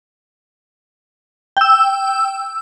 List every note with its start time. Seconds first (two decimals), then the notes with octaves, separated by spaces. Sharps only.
1.57 G5 E6